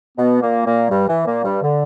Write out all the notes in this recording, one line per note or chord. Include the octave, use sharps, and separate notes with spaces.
B2 B3
A#2 A#3
A#2 A#3
G2 G3
E3
A#2 A#3
G2 G3
D3